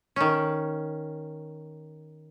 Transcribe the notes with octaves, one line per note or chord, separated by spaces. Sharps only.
D#3 C#4